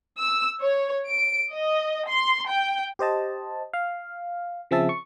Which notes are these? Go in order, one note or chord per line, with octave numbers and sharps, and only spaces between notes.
E6
C#5
D7
D#5
C6
G5
G4 C5 D#5 A5
F5
C#3 F3 C4 G#4 E5 A5
C#6